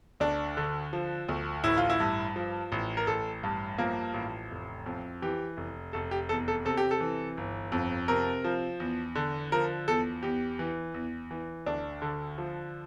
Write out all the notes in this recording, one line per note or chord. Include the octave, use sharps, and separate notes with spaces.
D2 D4
D3
F3
D2
A1 E4
F4
E4
G2
F3
A1
A#4
A1 A4
G2
F3 A#3
A1
F1
F2
E3 G4
F1
F1 A4
G4
E2 A4
A4
C3 A4
G4
A4
E3
G1
F2
C3 A#4
F3
E2
D3
F3 A#4
E2 A4
E2 G4
E3
E2
E3
D2 D4
D3
F3